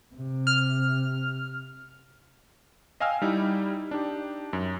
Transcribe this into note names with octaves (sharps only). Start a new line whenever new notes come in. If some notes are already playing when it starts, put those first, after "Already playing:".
C3
F6
D#5 F5 G5 G#5 E6 F6
G3 D#4 E4
D4 D#4 G4
F#2